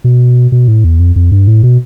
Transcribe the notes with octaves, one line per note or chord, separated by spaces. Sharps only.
B2
B2
A2
E2
F2
F2
G2
A2
B2